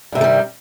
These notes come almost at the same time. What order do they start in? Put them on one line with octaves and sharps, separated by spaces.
G2 C3 D#3 A3 G3